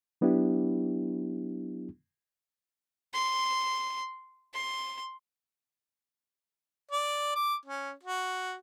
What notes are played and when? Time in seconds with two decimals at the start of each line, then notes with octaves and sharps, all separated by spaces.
0.21 F#3 B3 D4 E4 G4
3.13 C6
4.54 C6
6.91 D5
7.35 D6
7.65 C#4
8.03 F#4